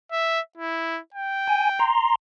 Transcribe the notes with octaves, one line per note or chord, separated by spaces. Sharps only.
E5
E4
G5
G#5
A#5 C6